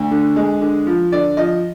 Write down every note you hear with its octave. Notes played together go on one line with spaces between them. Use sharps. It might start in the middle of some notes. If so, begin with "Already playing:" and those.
Already playing: D2
D3
G#3
D3
F3
D3 D5
F3 D#5